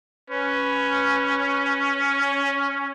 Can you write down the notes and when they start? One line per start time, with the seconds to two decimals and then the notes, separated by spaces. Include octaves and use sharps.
0.30 C#4 B4